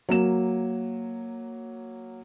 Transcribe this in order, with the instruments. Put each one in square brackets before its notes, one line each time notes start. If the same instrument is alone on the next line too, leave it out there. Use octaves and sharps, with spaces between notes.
[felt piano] F#3 A#3 E7